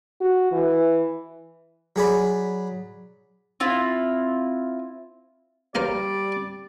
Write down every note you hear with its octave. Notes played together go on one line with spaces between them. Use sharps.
F#4
E3
F#3 G#4 D5 B5
C4 E4 F4
G3 A#3 A#4 C5 D5